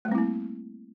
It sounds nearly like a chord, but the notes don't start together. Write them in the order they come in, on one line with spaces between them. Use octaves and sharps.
A3 G3 C4 E4 A#3